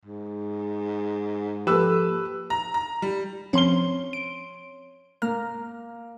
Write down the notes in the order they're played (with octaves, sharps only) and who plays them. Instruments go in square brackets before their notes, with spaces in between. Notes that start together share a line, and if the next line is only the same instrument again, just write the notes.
[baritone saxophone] G#2
[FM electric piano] F3 A#3 A4 [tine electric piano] G4 [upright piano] B4 E6
[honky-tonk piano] A#5
A#5
G3
[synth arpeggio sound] F3 C4 C#4 [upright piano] C#5 C6 G7
[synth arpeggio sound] D7
[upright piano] A#3 [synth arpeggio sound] A#5 F6